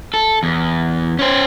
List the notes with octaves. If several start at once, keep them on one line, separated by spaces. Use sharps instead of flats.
A4
E2
C#4 C5